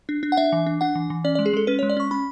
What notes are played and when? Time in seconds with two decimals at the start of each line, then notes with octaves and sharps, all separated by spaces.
0.09 D4
0.23 D4
0.32 F#5
0.37 D4 E5
0.52 E3
0.66 D4
0.81 D4 F#5
0.95 E3
1.10 E3
1.24 C#4 D5
1.35 D5
1.39 G#3
1.46 G#4
1.53 G#3 A4
1.67 C#4 B4
1.79 C#5
1.83 G#3
1.90 D5
1.97 C#4 C#6
2.11 C#4 B5